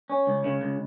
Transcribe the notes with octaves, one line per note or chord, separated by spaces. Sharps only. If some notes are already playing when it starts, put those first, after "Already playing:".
C#4
C#2
C#3
C#2